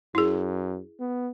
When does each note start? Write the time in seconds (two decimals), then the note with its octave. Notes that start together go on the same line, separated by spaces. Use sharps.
0.15 F#2 E4 G#4
1.00 B3